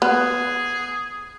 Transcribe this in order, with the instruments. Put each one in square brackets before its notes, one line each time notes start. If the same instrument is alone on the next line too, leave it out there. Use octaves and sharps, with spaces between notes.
[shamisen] B3 [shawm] G#4